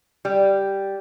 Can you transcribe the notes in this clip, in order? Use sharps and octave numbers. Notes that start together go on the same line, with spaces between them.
G3